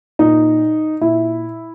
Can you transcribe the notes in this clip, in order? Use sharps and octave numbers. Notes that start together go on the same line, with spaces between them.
A#2 D#4
A#2 E4